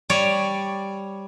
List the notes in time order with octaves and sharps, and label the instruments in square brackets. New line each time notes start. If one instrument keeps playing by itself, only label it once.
[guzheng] G3 C#5 D5